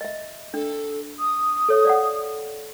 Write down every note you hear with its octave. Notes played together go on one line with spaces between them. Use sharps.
D#5 E5
D4 A4
D#6
A4 C#5 E5
D5 F5 F#5